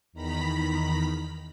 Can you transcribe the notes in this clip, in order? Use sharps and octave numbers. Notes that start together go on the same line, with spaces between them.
E2 D#3 A#5 B5 B6